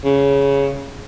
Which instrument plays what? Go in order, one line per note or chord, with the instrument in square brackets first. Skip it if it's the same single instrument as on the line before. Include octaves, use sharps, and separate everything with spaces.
[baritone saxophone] C#3